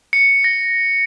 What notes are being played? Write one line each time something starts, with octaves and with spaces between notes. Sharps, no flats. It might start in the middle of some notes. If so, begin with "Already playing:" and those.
C#7
A#6